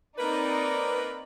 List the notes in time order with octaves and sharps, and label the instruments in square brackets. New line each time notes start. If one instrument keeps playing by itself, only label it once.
[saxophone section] A#3 A#4 B4 [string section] C4 D#4 D5